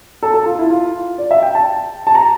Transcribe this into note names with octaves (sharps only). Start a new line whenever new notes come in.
A4
A4
F4
E4
F4
D5
E5
G5
A5
A5
A#5